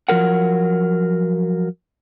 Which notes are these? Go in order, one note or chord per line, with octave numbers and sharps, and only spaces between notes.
F3 F#3 A#4 F#5